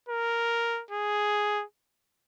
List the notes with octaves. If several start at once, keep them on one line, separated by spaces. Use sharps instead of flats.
A#4
G#4